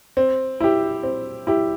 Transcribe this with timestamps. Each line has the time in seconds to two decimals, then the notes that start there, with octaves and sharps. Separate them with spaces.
0.17 C4
0.60 E4 G4
1.03 C4
1.47 E4 G4